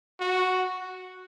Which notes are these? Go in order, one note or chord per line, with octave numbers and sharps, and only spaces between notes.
F#4